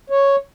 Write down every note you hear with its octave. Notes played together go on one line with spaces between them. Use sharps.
C#5